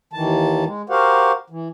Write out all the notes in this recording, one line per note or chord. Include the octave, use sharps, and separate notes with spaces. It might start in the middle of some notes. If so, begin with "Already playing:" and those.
D#2 D#3 E3 A5
G#3
F#4 G4 A#4 C5 F5 F#5
E3